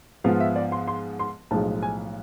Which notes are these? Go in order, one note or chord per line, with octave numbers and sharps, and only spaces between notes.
G#2 F3 B3 F4 F5
E5
D5
C6
C6
C6
B1 A2 F3 G#3 A5
G#5